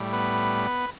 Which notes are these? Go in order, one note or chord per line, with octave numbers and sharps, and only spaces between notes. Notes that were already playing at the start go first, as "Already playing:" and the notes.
Already playing: A2 G3
B3 B4